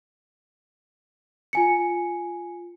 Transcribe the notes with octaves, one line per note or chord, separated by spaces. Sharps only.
F4 G#5 C#7